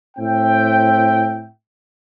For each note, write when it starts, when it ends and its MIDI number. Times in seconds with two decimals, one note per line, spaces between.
0.17 1.48 45
0.17 1.48 60
0.17 1.48 76
0.17 1.48 79